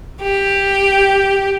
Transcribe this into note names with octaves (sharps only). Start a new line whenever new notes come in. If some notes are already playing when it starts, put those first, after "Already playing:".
G4